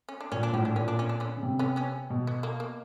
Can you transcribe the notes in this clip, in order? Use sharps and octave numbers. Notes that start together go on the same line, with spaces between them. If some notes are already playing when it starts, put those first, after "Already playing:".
C#4
D4
A#2 C#4
D4
A2 C#4
D4
A#2 C#4
D4
C#4
D4
B3 C#4
C#3
C3
B3 C#4
B3 C#4
B2
B3
A#3
A#3